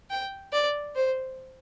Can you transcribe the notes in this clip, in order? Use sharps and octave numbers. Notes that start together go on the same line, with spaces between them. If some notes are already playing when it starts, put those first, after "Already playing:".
G5
D5
C5